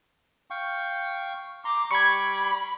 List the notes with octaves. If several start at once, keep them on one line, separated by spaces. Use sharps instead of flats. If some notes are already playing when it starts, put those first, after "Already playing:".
F5 G5 C#6
A#5 C6 D6
G3 B5 C#6 D6 G#6